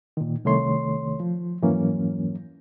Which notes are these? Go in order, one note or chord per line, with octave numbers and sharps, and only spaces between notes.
A#2 D#3
C2 D#3 A3 C#5 C6
F3
F2 G#2 E3 F#3 A#3 C#4